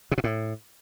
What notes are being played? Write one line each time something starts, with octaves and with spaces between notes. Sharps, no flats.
C3
B2
A2